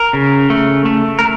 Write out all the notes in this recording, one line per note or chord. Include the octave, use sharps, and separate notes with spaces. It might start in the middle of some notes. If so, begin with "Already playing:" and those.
Already playing: A#4
C#3
A3
A3
A#4